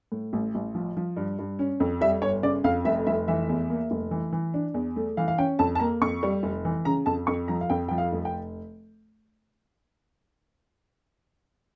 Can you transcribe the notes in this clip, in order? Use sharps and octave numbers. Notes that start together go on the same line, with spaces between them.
A2
A1
A1
F3
F3
G2
G2
C#4
F2
G3 E5
G1 C#5
C#3 D5
F2 F5
F1 E5
F1 E5
E3 E5
E2
A#3
F1
E3
E3
D4
E2
A3
E3 F5
F5
C#4 G5
F2 A5
A5
A#3 A#5
F2 C#6
G3
F1
E3
C#3 A#5
F2 A5
F2 C#6
F3 A#5
F5
F2 G5
F3 G5
F5
F1
G5